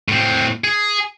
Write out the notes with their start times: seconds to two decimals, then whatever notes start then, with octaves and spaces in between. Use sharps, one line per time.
0.09 A2 C4
0.64 G#4